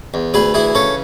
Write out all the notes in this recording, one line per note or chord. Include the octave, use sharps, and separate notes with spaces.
E2
D2 G#4 B4
E3 E4 G#4
C#3 A4 C#5